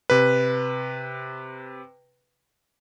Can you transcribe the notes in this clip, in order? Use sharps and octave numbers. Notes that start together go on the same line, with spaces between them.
C3 B4